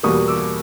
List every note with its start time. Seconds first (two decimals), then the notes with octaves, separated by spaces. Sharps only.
0.03 E2 B2 G3 A#3 C#6 D#6
0.28 D6 E6